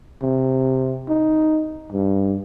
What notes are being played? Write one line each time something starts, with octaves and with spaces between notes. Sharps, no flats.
C3
D#4
G2